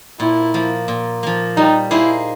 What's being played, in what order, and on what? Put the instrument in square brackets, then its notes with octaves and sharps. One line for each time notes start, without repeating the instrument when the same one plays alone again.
[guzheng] A#2 [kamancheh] E4
[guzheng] F3 A#3
A#2
F3 A#3
[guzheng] G3 [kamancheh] D#4
[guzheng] A#3 D#4 G#4 C5 [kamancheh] E4